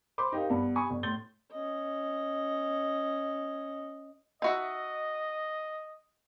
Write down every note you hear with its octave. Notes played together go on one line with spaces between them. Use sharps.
C5 B5 C6 D6
D#4 G4 A#4 C5 F5
G2 B3
G#5 B5 C#6 D#6
G1
A2 C6 G6 A6 G7
C#4 D#5
D#4 F#4 D#5 E5